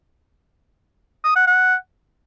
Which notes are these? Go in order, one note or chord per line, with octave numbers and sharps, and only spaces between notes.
D#6
F#5
F#5